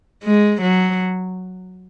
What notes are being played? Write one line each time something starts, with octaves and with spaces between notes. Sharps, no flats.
G#3
F#3